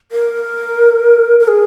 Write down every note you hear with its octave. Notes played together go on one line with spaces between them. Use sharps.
A#4
A#4
G#4